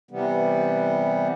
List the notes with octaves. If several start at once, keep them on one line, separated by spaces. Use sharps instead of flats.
C3 E3 G3 B3